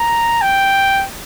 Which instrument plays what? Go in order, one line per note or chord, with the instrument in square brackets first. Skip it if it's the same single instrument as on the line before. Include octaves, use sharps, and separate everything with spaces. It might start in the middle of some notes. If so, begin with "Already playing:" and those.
Already playing: [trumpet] A#5
G5